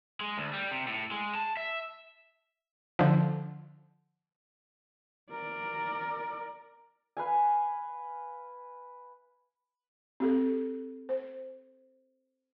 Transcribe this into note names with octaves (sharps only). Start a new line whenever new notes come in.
G#3
D2
G3
C3
A2
G#3
A5
E5
D3 F3
A#4 D5
B4 F5 G#5
C4 G4 A4
C5